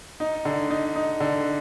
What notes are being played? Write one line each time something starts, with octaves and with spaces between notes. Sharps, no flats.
D#4
D3
D#4
D#4
D3